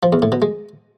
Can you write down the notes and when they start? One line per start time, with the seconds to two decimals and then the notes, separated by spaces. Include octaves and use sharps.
0.03 F3
0.13 E2
0.22 A2
0.32 B2
0.42 G#3